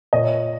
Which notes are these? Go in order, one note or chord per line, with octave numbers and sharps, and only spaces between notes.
A#2 C#5 D#5